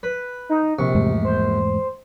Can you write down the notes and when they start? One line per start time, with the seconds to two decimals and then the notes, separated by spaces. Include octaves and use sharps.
0.03 B4
0.49 D#4
0.79 A#1 C3 C#6
0.95 E2 G#2 A3
1.24 C5